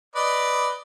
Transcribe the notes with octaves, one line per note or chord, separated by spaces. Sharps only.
B4 D5 D#5